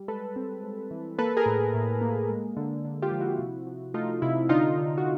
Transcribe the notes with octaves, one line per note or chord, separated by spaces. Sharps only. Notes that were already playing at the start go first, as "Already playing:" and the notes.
Already playing: G3
G#3 A4 B4
C4
G#3
E3
A#3 A4 B4
G#4 A#4
A2
A2
A#3
G#3
D3
D3
F4 G4
F3
E4 F#4
C3
F3
A3 D#4 F4
C3 E4
D3 D#4 F4
D3
F#4